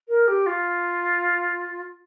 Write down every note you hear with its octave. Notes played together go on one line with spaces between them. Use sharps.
A#4
G4
F4